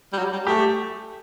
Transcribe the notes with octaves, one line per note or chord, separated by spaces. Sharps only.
G3
F#3
G3
A3 G4